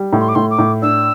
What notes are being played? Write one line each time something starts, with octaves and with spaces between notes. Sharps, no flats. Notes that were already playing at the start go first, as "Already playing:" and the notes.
Already playing: G3
A2
C6
D6
A2 C6
D6
A2
D4 E6